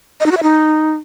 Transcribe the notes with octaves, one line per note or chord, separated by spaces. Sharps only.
D#5
D#4
F#4
E5
D#4